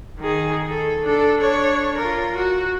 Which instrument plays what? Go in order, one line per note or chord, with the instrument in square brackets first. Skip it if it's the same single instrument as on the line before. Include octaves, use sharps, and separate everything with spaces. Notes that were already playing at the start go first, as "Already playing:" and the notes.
[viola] D#3 G#4
A4
D4 A4
D4 C#5
F4 A#4
F#4